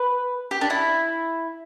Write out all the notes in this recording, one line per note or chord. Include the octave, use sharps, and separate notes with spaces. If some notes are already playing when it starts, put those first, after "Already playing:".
Already playing: B4
G4
D4
E4